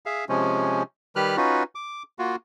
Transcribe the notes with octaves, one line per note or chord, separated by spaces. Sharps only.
G#4 E5 F5
C3 F3 G#3 C#4
D#3 G3 G4 B4 F6 F#6
C#4 D#4 F4 F#4 B4
D6
A#3 F4 F#4